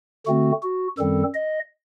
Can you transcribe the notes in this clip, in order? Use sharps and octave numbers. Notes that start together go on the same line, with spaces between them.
D3 A3 C4 F#4
F#4
F#2 D#3 G3 C4 A4
D#5